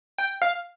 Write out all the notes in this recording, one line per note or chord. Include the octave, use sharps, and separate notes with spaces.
G5
F5